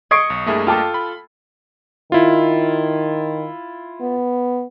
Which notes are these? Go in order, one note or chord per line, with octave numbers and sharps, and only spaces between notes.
D#5 C#6 G#6 C7 D7
B1
G2 A3 A#3 E4 G#4
F4 A4 G5 A5 D6
B5
D#3 E4 F4
B3